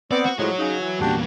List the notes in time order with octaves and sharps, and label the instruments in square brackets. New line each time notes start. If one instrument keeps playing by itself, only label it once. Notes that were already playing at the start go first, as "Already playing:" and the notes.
[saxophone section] B3 C4 [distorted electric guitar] D5
[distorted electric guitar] F#4
[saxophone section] A2 F3 G#3 [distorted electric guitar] F#4 C#5
[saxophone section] C#3 D#4
E3
[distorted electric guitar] E2 A#2 [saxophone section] D4 F#4 G4